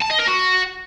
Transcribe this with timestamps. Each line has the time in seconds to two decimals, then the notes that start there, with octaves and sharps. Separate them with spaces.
0.01 A5
0.10 D#5
0.19 A#4
0.27 F#4